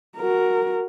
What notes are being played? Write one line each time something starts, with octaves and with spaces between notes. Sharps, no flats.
F#4 A#4